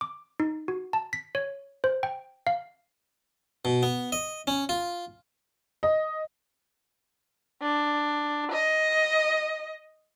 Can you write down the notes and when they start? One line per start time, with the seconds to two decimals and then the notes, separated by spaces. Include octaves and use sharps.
0.01 D6
0.40 D#4
0.68 F#4
0.93 A5
1.13 B6
1.35 C#5
1.84 C5
2.03 G5
2.47 F5
3.65 B2
3.83 B3
4.12 D#5
4.47 C#4
4.69 F4
5.83 D#5
7.62 D4
8.52 D#5